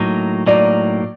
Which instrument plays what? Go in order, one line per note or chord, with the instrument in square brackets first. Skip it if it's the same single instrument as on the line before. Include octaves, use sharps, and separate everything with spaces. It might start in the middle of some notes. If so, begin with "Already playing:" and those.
Already playing: [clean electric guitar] A2 F#3 A#3 D#4
[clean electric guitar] A2 F#3 A#3 D#4 [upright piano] D5